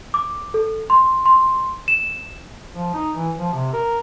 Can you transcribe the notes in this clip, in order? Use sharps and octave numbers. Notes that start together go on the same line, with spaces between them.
D6
A4
C6
C6
E7
F3
D#4
E3
F3
C3
A#4